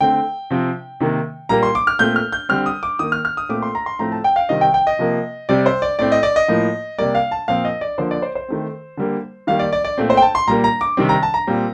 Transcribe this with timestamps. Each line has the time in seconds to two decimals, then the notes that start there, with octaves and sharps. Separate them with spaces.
0.01 D3 A3 C4 G5
0.50 C3 F3 C4
1.00 C3 D#3 A#3
1.49 A#2 G3 A#3 A#5
1.63 C6
1.75 D6
1.87 F6
1.99 A#2 A3 C4 G6
2.16 F6
2.32 G6
2.49 D3 G3 C4 F6
2.66 D#6
2.83 D6
2.99 D#3 A#3 D#6
3.12 F6
3.25 F6
3.37 D#6
3.49 A#2 A3 C4 D6
3.62 C6
3.75 A#5
3.86 C6
3.99 A2 F3 A3 C4 A#5
4.12 A5
4.24 G5
4.36 F5
4.49 C3 D#3 G3 C4 D#5
4.61 G5
4.74 G5
4.87 D#5
4.99 C3 F3 A#3
5.49 C3 G3 C4 D5
5.66 C5
5.82 D5
5.99 A2 A3 C4 D5
6.12 D#5
6.23 D5
6.36 D#5
6.48 A2 F3 A#3
6.98 C3 G3 A#3 D5
7.15 F5
7.31 A5
7.48 A#2 F3 C4 F5
7.65 D#5
7.81 D5
7.98 D3 F3 A#3 C5
8.11 D5
8.22 C5
8.35 C5
8.48 D#3 A3 C4
8.97 D3 G3 A#3
9.47 D#3 G3 A#3 F5
9.59 D5
9.73 D5
9.85 D5
9.98 A#2 A3 C4
10.10 C5
10.17 G5
10.22 A5
10.35 C6
10.48 A#2 G3 A#3 A#5
10.64 A#5
10.81 D6
10.97 C3 D#3 G3 C4
11.09 A#5
11.23 A5
11.34 A#5
11.47 A#2 G3 C4